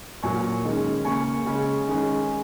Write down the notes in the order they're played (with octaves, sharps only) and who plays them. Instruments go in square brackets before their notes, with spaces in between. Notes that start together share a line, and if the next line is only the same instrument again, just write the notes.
[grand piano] A#2 F#3 A#3 G#5 C#6
D#3 G#3 C#4
C#3 A#3 C#4 G#5 C#6
C#3 G#3 C#4
D#3 G#3 C#4